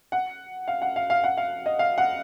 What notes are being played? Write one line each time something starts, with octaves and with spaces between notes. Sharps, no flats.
F#5
F5
F#5
F5
F5
F#5
F5
D#5
F5
F#5